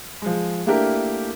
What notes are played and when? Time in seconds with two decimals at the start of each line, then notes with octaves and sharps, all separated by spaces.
0.22 F3 G#3
0.66 A3 A#3 D4 E4 G4 A#4